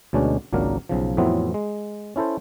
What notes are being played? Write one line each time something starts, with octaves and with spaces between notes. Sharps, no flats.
D2 B2 G#3 C#4 D4
G#1 C#2 F#3 A#3 D4 A#4
B1 C#3 F3
F2 A2 E3 F#3 B3 C4
G#3
C#4 E4 A4 C5